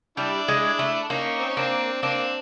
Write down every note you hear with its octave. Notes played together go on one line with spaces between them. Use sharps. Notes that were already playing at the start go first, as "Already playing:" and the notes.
G3 D4 E4
G#3
A3
A#3 C#4 D#4
C4
C#4
A#3 C4 D4
A#3 C4 D4